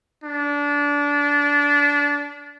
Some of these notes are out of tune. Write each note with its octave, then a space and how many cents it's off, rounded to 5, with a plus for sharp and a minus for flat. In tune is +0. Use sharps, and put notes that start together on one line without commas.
D4 -25